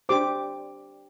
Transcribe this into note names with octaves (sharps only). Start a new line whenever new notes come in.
D4 G4 C5 D6